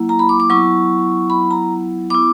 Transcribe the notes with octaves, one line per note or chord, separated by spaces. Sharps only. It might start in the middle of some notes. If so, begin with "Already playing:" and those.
Already playing: F#3 A#3 E4
A#5
B5
D6
D6
F#3 B3 E4 C#6
B5
A#5
B3 E4 D6